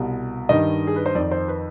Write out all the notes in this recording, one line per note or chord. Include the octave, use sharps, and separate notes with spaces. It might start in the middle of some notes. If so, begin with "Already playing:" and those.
Already playing: C2 B2
G2 D#3 D#5
G#4
B4
C5
F2 D#3 D5
C5
B4